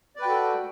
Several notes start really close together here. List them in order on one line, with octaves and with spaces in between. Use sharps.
D5 B4 G5 F#4 A4